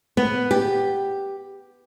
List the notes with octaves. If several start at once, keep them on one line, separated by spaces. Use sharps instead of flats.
B3
G4